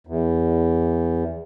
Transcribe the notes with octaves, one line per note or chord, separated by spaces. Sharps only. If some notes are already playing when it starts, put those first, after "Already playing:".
E2